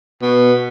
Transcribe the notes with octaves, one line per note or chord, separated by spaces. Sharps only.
B2